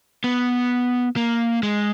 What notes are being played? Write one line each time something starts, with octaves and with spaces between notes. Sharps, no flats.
B3
A#3
G#3